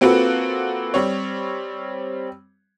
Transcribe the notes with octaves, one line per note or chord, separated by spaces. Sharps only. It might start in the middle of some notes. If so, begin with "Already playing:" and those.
A#3 C4 F4 F#4 A4 B4
G3 C4 C#5